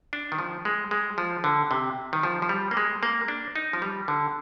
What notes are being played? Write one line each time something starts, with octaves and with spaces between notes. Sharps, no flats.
D4
D#3
F3
G#3
G#3
F3
D3
C3
D#3
F3
F3
G3
A#3
G#3
A#3
D4
D#4
F3
G3
D3